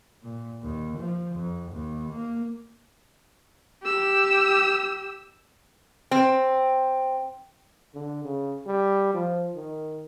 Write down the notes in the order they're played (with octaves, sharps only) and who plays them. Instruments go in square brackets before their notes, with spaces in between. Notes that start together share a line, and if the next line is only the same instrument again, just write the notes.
[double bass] A#2
D#2
F3
F2
D#2
A#3
[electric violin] G4 E6
[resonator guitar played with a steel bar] C4
[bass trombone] D3
C#3
G3
F3
D#3